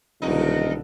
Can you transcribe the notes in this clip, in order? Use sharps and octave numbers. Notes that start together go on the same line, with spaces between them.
D#1 B1 F2 D3 D#4